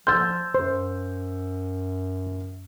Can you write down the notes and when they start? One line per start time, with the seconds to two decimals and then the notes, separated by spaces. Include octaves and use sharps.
0.07 F3 C6 E6 G6 A6
0.54 F#2 C5